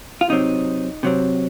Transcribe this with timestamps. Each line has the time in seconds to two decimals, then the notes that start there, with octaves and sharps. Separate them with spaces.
0.21 F4
0.29 C3 F#3 C4 D#4
1.03 C3 F#3 C4